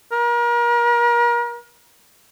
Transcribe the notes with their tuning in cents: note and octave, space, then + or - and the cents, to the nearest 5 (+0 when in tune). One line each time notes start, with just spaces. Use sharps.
A#4 +35